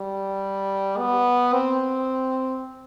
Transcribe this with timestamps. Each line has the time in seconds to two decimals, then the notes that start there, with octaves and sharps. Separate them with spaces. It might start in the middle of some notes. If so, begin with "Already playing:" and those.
Already playing: G3
0.98 B3
1.53 C4